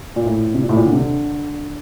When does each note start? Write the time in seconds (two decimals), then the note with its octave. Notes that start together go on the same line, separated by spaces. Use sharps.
0.16 A#2
0.26 A2
0.55 C3
0.63 A#2
0.69 A2
0.76 A#2
0.85 D3
0.92 C3
0.99 D3